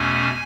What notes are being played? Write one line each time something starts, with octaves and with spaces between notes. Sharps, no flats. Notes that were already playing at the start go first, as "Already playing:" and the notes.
Already playing: E2 B2 A3 C#4 G#5